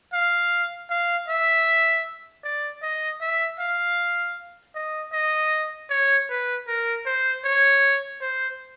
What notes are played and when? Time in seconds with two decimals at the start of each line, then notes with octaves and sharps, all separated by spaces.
0.13 F5
0.90 F5
1.28 E5
2.44 D5
2.83 D#5
3.21 E5
3.60 F5
4.75 D#5
5.13 D#5
5.90 C#5
6.30 B4
6.68 A#4
7.06 C5
7.45 C#5
8.21 C5